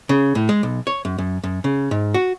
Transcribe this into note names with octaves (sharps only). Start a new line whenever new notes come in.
C#3
A2
G#3
B1
C#5
F#2
F#2
F#2
C#3
G#2
F#4